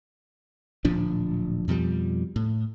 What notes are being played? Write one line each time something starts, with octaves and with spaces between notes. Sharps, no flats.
D1 A#2 F3 D4
F2 B2 F3 G3
A2